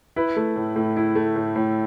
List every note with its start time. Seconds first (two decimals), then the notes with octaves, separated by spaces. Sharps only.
0.16 E4 B4
0.36 A3
0.56 A2
0.76 A2
0.96 E4
1.15 A3
1.36 A2
1.56 A2